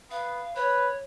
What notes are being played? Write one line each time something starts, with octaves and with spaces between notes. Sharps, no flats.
B3 F5
B4 C#5